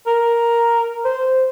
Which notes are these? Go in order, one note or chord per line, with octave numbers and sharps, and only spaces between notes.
A#4
C5